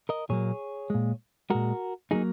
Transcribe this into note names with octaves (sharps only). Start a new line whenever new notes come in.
A#4 D#5
A#2 F#3 A#3 G#4 C#5
A#2 G#3
A#2 G#3 F#4 A#4
F#3 A#3 D#4 G#4